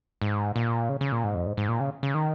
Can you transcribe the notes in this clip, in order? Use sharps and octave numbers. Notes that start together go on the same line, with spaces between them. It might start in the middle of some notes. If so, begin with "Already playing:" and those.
G#2
A#2
C#3
C#3
A#2
G#2
F2
G#2
G#2
A#2
C#3
C#3
D#3